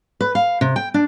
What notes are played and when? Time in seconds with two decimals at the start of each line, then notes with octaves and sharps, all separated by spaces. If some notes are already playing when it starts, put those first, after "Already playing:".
0.21 B4
0.35 F5
0.61 C3
0.76 G5
0.94 D4